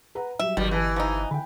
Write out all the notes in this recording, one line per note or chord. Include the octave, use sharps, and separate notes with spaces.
B4 F#5 A#5
F#3 G3 E5
G1 B2 D#3 F#3 G3 G4
E3 G4 B4 A5
F3 D#4
D3 G5 B5